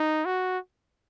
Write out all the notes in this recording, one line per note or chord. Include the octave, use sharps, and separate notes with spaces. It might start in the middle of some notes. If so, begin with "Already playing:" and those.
Already playing: D#4
F#4